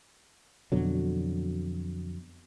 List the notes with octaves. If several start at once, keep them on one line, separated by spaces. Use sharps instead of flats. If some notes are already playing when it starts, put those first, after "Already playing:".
F2 B2 D3 F#3